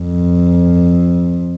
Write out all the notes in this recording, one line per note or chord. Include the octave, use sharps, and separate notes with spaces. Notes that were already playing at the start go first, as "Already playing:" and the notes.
Already playing: F2